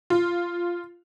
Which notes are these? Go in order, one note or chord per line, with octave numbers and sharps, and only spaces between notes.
F4